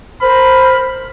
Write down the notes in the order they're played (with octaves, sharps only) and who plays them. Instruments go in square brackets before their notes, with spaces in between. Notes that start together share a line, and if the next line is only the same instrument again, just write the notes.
[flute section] A#4 C5 F6 [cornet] B5